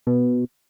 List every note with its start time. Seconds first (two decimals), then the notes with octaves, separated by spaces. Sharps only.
0.07 B2